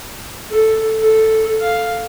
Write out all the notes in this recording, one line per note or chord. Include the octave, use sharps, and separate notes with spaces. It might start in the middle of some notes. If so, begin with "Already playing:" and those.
A4
A4
F5